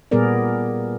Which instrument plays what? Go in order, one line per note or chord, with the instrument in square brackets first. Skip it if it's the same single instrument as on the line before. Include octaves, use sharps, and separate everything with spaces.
[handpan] A#2 G3 B3 G#4 A#4 D5